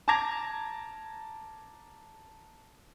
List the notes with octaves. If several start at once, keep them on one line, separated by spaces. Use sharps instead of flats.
A5 A#5 D6 G#6 A#6 F7